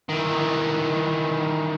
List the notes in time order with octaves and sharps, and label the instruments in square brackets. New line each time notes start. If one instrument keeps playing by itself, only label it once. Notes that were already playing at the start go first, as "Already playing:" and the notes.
[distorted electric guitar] D#3 E3